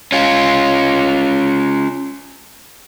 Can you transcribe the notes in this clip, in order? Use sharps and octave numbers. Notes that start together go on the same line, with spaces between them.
C#4 F4